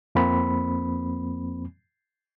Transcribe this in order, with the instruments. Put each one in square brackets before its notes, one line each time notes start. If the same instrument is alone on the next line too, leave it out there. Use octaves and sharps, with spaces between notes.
[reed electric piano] F2 F3 A#3 C4 B5